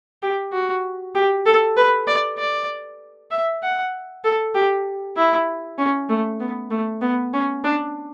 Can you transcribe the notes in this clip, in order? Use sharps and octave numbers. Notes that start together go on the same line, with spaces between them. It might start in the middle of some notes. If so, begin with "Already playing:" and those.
G4
F#4
G4
A4
B4
D5
D5
E5
F#5
A4
G4
E4
C#4
A3
B3
A3
B3
C#4
D4